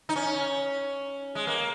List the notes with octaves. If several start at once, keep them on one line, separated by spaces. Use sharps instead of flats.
D#4
C#4
G#3
A#3